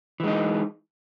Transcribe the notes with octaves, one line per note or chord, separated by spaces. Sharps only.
E3 G#3 D#4